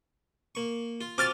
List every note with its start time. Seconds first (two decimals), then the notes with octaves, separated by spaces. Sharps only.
0.55 A#3 C#6
1.01 F4
1.18 F3 C4 F#4 D6 F6 A6